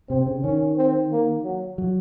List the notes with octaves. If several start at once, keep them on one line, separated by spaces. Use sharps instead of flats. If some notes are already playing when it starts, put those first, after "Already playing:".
C3 C4
C#3
D#3 C#4
C4
A#3
F#3
F#3